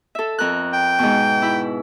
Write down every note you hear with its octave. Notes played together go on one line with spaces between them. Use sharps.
A4 E5
F2 A#4 F#6
G5
G#2 B2
E4 B5